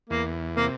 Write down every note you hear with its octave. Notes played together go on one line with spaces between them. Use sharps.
E2 A#3
C3 A#3